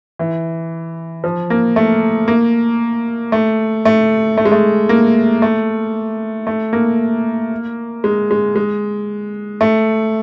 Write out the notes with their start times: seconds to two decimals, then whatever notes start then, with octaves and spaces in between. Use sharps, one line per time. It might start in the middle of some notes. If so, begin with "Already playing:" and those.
0.19 E3
1.24 F3
1.50 A#3
1.76 A3
2.28 A#3
3.32 A3
3.85 A3
4.38 A3
4.45 G#3
4.52 A3
4.89 A#3
5.42 A3
6.47 A3
6.73 A#3
8.04 G#3
8.31 G#3
8.56 G#3
9.61 A3